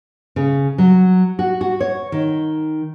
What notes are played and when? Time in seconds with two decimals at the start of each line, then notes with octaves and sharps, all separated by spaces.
0.36 C#3
0.78 F#3
1.39 F#4
1.61 F#4
1.80 C#5
2.12 D#3